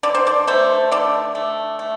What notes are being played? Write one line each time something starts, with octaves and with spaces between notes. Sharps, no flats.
D3 D5
C5
D5
A3 C5
D3 D5
A3
A3